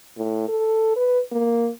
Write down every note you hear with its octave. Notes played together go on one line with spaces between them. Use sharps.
A2
A4
B4
A#3